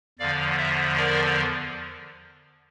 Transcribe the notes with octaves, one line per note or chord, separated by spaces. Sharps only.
E2 D3 F3 D5 F5
C5 E5
A#4 D5